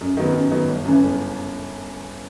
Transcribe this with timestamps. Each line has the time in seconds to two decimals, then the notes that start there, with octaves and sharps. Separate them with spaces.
0.01 F#2
0.17 D#3 F#3 B3
0.34 F#2
0.51 D#3 F#3 B3
0.69 G1
0.85 F#2 C#3 E3
1.03 G1